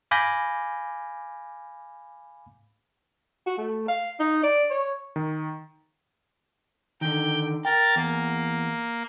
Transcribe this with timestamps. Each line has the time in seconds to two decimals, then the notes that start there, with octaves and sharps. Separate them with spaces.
0.11 F5 G#5 B5 D6 G6 A#6
3.46 F#4
3.58 A3
3.88 F5
4.20 D#4
4.43 D5
4.71 C#5
5.16 D#3
7.01 D3 D#3 G5
7.65 A#4 G5 A6
7.96 E2 A#3